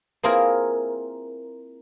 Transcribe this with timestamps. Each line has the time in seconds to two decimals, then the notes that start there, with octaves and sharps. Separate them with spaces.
0.23 A#3 C4 E4 F4 G#4 A#4